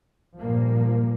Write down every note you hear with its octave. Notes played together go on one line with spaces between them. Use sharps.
G2 A#2 F3 A#3